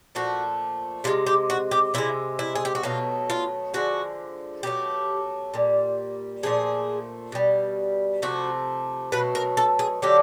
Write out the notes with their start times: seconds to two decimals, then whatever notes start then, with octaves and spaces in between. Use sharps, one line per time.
0.15 A#2 F3 A3 F#4
1.04 C3 D#3 G#3 F4
1.27 G4
1.50 F#4
1.71 G4
1.94 C3 E3 G#3 E4
2.39 E4
2.55 G#4
2.65 G4
2.75 F#4
2.83 B2 F#3 A3 F4
3.30 F4
3.74 D3 F3 G#3 F#4
4.63 B2 F#3 A3 G4
5.54 A#2 G3
6.43 A#2 F3 A3 G#4
7.32 B2 G3
8.22 C3 F3 A3 F#4
9.12 B2 F#3 A3 B4
9.35 A#4
9.57 A4
9.79 G#4
10.02 D3 F#3 A3 G4